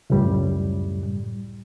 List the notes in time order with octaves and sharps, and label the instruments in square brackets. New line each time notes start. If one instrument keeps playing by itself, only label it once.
[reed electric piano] C#2 F#2 A2 G3